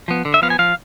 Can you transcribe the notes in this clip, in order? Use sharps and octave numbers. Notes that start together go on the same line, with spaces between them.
F3 B3
D3
E5
F3 B3 F5
G#5
F3 F5